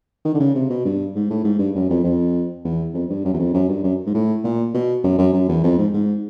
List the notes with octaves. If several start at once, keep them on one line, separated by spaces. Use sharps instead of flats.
D#3
D3
C#3
C3
B2
G2
G#2
A2
G#2
G2
F#2
F2
F2
E2
F2
G2
F#2
E2
F2
F#2
G2
F#2
G#2
A2
A#2
B2
F#2
F#2
F#2
E2
F2
G#2
G#2